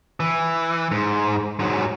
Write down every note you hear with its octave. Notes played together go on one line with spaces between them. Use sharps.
E3
G#2
G#2 F#3